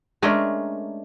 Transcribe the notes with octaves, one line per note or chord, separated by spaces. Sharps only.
G#3 A3 C#4 D4 A#4